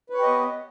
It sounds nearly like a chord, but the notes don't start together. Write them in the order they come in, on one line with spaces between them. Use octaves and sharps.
B4 C#5 G4 D#5 B3